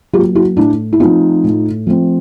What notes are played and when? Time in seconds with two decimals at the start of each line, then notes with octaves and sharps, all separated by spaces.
0.13 F#3 F4 G4
0.17 A#3
0.35 E4 F#4
0.56 A2 D4 E4
0.93 E4
1.00 F3 A3 C4 D#4 F4
1.43 A2
1.87 F3 A3 C4